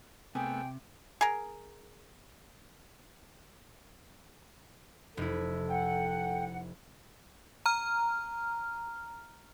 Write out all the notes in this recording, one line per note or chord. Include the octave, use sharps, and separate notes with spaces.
C3 A3 B3 G#4 C5 G5
G#4 A#4
F1 E4 A4
F#5 G5
A#5 F6